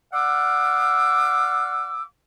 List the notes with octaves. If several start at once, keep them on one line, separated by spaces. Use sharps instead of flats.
D5 F5 F#5 D6 E6